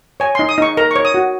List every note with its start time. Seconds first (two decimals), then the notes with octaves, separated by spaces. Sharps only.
0.20 C#5 G#5
0.35 D#4 C6
0.49 D#6
0.58 D#4 C#6
0.77 A#4 A#5
0.91 C#5 C#6
1.05 D#6
1.14 F#4